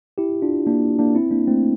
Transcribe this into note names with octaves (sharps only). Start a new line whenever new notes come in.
E4 G4
D4 F4
A#3 D4
A#3 D4
C4 E4
A#3 D4
A3 C4